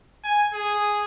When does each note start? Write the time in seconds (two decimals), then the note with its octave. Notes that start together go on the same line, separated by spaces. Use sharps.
0.25 G#5
0.54 G#4